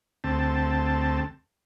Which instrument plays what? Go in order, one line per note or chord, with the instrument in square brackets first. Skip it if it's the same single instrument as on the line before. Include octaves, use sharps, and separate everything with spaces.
[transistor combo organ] D2 C4 A5